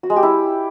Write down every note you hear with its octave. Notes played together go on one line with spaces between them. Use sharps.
F#4
G#3
G4
E4